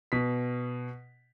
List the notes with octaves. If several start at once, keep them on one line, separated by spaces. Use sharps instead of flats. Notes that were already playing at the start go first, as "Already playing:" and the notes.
B2 B6